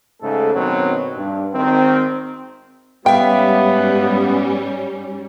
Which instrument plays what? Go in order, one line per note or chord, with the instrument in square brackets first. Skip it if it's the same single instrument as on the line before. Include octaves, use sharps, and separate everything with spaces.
[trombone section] G#2 C#3 A3 A4
F#2 B2 D#3 F#3 C4
G2
G#1 D#3 C4
[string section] G#2 G3 C#4 [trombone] B3 [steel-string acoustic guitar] E5 F5 [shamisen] G5